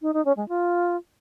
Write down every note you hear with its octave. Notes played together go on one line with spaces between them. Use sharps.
D#4
D#4
C#4
G#3
F4